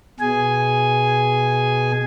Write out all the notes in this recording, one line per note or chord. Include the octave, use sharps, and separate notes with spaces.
B2 G#4 G#5